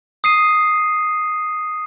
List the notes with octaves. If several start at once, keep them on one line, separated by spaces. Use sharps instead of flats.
D#6 C7 D#7